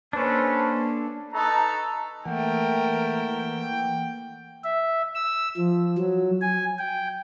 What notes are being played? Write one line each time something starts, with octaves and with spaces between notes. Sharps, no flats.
A#3 C#4 D4 A4 B4 C5
D#4 A4 B4 C#5 A5 A#5
E3 A3 A#3 A#4 F#5 G5
E5
E6
F3
F#3
G#5
G5